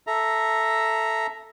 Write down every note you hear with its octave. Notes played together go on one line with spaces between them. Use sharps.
A4 E5 A#5